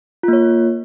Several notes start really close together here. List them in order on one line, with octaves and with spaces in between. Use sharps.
F4 A#3 C#5